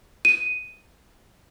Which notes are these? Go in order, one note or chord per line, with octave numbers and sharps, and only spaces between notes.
D#7